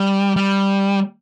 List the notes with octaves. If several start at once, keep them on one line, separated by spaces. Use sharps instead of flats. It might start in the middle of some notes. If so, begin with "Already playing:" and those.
Already playing: G3
G3